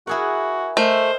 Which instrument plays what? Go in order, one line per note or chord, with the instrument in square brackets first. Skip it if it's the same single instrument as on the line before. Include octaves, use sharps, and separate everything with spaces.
[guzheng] E4 G#4 F#5 [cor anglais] F#4 [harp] A#4 G#5
[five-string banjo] A3 [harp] A#4 D#5 E6 [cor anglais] C5